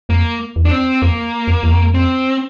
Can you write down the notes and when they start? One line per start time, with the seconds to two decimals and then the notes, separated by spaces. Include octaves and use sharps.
0.09 F2 A#3
0.56 E2
0.65 D4
0.71 C4
1.02 F2 A#3
1.47 F2
1.63 E2
1.71 F2
1.94 C4